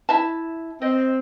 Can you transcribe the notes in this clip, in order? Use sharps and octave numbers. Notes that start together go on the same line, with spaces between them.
E4 E5 A5
C4 D#5